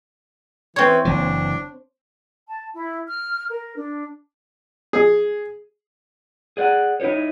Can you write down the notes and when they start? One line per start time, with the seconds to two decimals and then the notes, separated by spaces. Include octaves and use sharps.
0.76 E3 C4 C#5
1.05 F#1 E3 D4
2.47 A5
2.74 E4
3.08 F6
3.49 A#4
3.76 D4
4.93 G#4
6.57 G#4 D5 F#5
7.00 D#4 E4 G4 A4 C#5